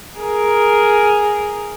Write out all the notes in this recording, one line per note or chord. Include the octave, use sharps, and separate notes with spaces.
G#4 A#4